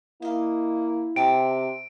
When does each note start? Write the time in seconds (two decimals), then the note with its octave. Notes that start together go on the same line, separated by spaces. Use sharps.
0.22 A#3 E4 D#5 F5
1.16 C3 G5 A5 A#5 D7